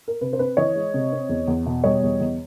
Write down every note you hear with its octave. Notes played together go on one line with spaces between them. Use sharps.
A#4
C3 B4
C5
C4 B4
E3 C#5 D#5
G#3
C3
C4
E2
E2
B2
G3 C#5 D#5
E2
E2